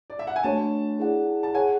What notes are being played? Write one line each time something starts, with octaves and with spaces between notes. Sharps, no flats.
D5
E5
F#5
G#5
A3 D4 F#4 C#5 A5
E4 G#4 D5 F#5
A5
G#4 C#5 F#5 G#5